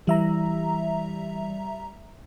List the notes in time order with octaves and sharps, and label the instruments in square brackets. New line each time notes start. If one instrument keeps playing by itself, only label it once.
[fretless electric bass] E3 [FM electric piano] G3 E5 A#5